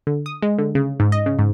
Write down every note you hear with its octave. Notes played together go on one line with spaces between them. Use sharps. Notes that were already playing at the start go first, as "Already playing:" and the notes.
D3
D#6
G#3
D3
C#3
G#2
D#5
C#3
G#2